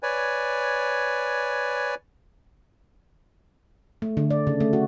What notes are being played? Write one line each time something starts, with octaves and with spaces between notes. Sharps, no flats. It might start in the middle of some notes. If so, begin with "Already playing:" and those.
B4 C#5 D5 G#5
A3
D3
D5
C#3
A3
F#4